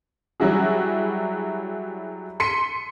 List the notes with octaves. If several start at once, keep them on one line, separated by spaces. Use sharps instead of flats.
F#3 G3 E4 F#4 G#4
C6 B6 C#7 D#7